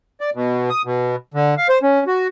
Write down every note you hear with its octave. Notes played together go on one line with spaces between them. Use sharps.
D5
B2
D#6
B2
D3
F5
C5
C#4
F#4